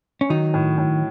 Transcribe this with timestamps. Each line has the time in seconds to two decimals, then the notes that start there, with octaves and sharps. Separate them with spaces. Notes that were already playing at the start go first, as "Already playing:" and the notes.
0.21 C#4
0.29 D#3 F#3 D#4
0.54 A2
0.78 A2